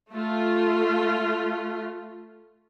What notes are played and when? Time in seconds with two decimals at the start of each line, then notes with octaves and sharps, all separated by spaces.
0.12 A3 F4